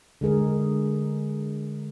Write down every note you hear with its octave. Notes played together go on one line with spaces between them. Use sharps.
D3 G#3 G#4 A#4